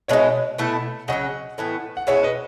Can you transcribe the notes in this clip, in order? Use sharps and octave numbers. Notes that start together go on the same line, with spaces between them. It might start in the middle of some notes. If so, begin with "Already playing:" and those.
B2 G#3 D#4 C#5 E5
B2 A3 E4 A4
C#3 F#3 C#4 D#5 F#5
A2 E3 B3
F#5
B2 G#3 C#4 E4 C#5 E5
B4 D#5